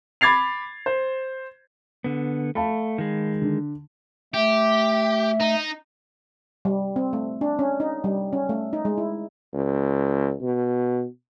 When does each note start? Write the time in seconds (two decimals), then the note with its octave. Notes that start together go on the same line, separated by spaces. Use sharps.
0.21 B5 D6 G#6 A6 C7 F7
0.86 C5
2.04 D3 B3
2.55 A3 F5 A5 B5
2.98 D#3 G#3
3.42 D3
4.34 A3 G4 E5
5.40 D#4
6.65 G3
6.96 C4
7.13 A3
7.41 D4
7.59 C#4
7.80 D#4
8.04 G3
8.33 C#4
8.49 A3
8.73 D#4
8.85 G#3
8.98 E4
9.53 C#2
10.41 B2